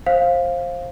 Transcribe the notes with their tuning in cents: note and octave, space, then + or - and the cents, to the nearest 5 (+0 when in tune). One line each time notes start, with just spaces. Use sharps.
C5 +25 F5 +0